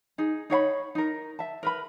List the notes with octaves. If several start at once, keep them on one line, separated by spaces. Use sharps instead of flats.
D#4 G#4
D#4 C#5 F5 B5
D#4 A#4
E5 A5
A#4 B4 B5